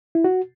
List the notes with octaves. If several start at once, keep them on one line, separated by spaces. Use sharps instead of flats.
E4
F#4